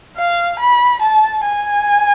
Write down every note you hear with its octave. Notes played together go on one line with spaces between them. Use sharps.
F5
B5
A5
G#5